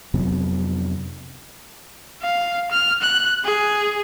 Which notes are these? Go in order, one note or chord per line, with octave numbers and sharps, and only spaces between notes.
F2 C3 F#3 B3
F5
F6
F#6
G#4